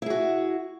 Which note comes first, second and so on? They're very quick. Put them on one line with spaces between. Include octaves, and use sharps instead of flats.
E4 G#4 F#4